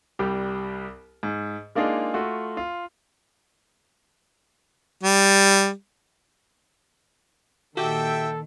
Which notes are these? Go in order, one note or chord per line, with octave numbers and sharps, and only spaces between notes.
C2 G3 G4
G#2
G#3 A#3 D4 D#4 F4 G#4
A3 F4 F#4
F4
G3
A#2 D#3 F#4 G4 A4 E5 G5